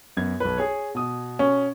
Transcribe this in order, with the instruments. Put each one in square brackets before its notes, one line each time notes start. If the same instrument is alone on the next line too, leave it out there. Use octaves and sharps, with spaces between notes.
[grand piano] F#2 B3 G#6
B1 B4
G#4 C#5
B2 D#6
[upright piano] C#4